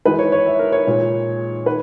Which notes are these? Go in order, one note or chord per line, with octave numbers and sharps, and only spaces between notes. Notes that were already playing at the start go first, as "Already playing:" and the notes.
E3 G#3 D#4 B4
C#5
C#5
E5
A#4
C#5
A#2 G#3 D#4
D#3 B4